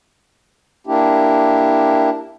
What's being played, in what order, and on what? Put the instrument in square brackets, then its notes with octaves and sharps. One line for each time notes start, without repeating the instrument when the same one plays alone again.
[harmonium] A#3 D4 E4 G4